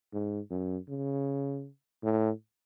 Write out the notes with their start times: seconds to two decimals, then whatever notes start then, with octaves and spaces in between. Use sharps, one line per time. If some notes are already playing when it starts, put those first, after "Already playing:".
0.13 G#2
0.51 F#2
0.88 C#3
2.03 A2